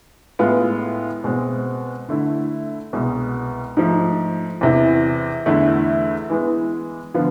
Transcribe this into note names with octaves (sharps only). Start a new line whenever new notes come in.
A2 G#3 B3 F4
B2 G#3 C4
D3 A3 E4
C2 B2 G#3
G#2 F3 A3
E2 C3 E3
E2 D3 A3 E4
E3 G#3 B3
D3 F3 B3 F4